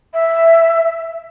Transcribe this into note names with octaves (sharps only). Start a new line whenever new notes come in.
E5